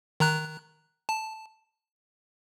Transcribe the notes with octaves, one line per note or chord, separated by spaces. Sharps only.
D#3 A#5 F#6
A5